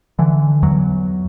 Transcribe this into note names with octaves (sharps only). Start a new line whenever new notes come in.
D3 E3
E2 F#3